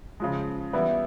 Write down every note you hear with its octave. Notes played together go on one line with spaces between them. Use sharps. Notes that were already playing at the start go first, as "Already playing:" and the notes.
C#3 F3 G#3
E3 G3 B3 E4